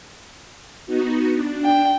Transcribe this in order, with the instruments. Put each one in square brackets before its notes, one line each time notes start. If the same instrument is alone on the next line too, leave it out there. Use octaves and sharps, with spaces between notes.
[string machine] B3 D#4 F#4
D4
[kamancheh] G5